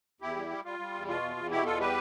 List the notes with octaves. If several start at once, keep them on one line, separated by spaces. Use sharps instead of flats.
E2 E4 G4
G3
G3
G3 F4
G3
E2
B2 F4
E2
E2
B2 E4 G4
E2 F4 A4
G3 G4 B4